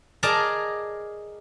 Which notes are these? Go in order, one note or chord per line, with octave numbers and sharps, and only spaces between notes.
G#4 A#4 D5 D#5 A5 A#5